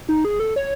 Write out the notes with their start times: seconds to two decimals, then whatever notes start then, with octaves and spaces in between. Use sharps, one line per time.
0.09 D#4
0.25 G#4
0.40 A4
0.56 C#5